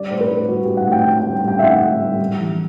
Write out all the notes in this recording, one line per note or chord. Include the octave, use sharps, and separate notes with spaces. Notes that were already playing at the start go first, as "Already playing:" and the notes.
Already playing: G3 D5
A2 C5
B4
A2
G3 F#4
G3 G4
F#5
A2 G5
A2
G5
G3
G3 G5
E5
A2 F#5
A2
G3
G3
E3